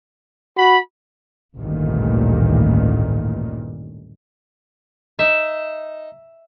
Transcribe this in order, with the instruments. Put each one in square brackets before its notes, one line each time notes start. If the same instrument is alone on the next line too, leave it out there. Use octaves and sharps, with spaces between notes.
[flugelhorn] F#4 [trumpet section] B5
[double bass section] A1 D2 G2 A#2 D#3
[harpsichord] D#4 [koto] E5